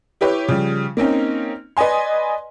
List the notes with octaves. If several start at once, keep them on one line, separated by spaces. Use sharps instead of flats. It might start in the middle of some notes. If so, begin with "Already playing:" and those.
E4 G4 B4 C#5
C#3 F3 G3
A#3 C4 C#4 D#4
B4 D5 D#5 G#5 C6